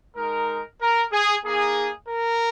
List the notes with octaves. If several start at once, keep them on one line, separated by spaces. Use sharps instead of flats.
G#3 D#4 A#4
A#4
G#4
A#3 D#4 G#4
A#4